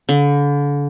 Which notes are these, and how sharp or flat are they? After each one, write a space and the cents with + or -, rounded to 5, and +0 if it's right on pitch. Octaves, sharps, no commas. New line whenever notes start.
D3 -35